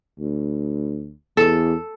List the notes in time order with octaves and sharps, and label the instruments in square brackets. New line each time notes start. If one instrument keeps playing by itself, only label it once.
[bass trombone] D2
[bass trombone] E2 [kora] A4